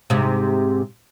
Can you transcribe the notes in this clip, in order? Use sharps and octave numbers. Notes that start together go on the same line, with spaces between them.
G#2 C3